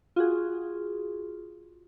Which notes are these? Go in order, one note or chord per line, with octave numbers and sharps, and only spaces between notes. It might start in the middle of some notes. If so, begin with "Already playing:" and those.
F4 F#4 G#4